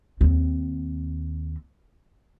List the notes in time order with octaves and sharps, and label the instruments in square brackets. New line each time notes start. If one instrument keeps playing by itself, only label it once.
[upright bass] D#2 C4